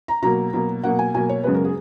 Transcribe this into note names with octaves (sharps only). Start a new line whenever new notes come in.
A#5
B2 F#3 A#3 A#5
B2 F#3 A#3
B2 F#3 A#3 F#5
G#5
B2 F#3 A#3 G#5
C#5
F#2 C#3 G#3 B3 B4
A#4
G#4